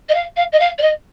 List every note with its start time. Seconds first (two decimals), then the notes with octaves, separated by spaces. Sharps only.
0.09 D#5
0.14 F5
0.36 F5
0.52 D#5
0.60 F5
0.78 D5
0.82 D#5